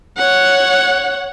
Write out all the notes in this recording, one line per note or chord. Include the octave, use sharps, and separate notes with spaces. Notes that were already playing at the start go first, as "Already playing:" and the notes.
C#5 F#5